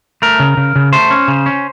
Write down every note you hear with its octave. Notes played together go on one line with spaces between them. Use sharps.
A3 A#4
C#3
C#3
C#3
A3 C5
C#4
C#3
C#4